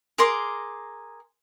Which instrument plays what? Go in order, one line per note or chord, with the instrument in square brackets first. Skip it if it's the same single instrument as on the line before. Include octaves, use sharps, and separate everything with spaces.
[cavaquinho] G#4 A#4 C6 D6